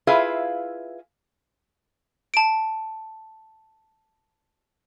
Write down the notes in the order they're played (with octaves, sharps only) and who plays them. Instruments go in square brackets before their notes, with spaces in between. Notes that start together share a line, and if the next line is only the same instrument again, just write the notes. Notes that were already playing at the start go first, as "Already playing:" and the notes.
[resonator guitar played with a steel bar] E4 F4 G#4 B4 E5 F5
[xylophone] A5 D7